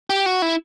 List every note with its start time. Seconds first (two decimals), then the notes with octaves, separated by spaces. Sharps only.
0.10 G4
0.26 F#4
0.42 E4